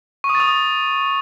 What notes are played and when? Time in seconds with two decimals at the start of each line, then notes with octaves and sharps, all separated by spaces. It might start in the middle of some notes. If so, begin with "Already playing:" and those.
0.24 C#6
0.29 D#6
0.35 A6
0.40 D#6